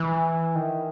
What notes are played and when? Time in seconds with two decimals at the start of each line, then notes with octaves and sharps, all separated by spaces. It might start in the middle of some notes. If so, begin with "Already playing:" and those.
Already playing: E3
0.55 D#3